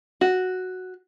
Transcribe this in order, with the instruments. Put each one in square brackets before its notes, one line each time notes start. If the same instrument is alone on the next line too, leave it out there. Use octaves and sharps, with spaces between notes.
[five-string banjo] F#4